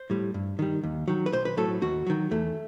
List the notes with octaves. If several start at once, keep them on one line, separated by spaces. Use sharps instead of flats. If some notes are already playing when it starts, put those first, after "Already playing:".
Already playing: C5
A2 G3
G2
D#3 G3
D#2
D#3 F#3
B4
B1 C5
B4
A2 F#3 A4
D#2 F#4
D#3 F#3
E2 A3